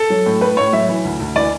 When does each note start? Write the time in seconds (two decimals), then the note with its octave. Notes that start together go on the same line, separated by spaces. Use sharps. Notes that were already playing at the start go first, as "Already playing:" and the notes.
Already playing: A4
0.10 F#3
0.26 A2
0.41 A2 B4
0.57 A2 C#5
0.73 F#3 E5
0.89 E3
1.04 D2
1.20 D2
1.35 E3 D5